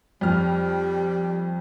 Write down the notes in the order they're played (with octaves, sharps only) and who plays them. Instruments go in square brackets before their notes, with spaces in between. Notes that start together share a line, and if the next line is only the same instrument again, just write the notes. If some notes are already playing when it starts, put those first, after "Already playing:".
[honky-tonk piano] F2 F6 [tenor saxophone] G3